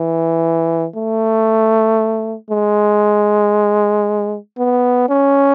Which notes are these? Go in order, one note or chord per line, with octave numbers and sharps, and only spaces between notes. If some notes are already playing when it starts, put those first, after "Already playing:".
Already playing: E3
A3
G#3
B3
C#4